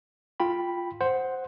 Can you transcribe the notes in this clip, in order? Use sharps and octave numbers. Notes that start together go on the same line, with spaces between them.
F4 G5 B5
C5 F#5